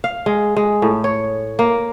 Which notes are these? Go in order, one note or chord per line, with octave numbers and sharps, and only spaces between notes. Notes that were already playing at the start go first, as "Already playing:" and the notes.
F5
G#3
G#3
A2
C#5
A#3